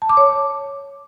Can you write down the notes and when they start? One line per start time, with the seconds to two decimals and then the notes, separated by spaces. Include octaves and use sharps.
0.02 A5
0.09 D6
0.17 C#5